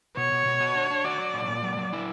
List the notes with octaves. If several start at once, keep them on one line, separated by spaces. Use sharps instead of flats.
B2 C#5
B2
B2
F#4
D4
D4
F#4 D5
F#3
A#2
A#2
F#3
F#3
E4